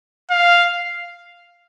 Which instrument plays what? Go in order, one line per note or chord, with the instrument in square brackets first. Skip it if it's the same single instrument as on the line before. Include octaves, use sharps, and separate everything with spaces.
[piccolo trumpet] F5